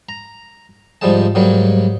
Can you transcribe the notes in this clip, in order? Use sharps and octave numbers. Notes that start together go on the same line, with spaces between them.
A#5
G#2 F3 G3 G#3 A5
G#2 F#3 G3 A#3